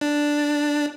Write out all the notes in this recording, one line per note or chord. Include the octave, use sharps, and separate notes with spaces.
D4